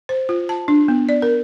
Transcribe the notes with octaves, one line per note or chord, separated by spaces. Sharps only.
C5
F4
A5
D4
B3
D5
A#4